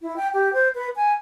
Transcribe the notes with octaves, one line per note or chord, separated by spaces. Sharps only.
E4
G5
G4
C5
B4
G#5